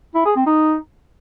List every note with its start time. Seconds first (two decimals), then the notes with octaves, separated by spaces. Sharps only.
0.15 E4
0.25 G#4
0.36 C4
0.46 D#4